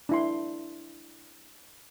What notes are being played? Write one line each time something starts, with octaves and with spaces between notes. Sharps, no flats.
D4 E4 C6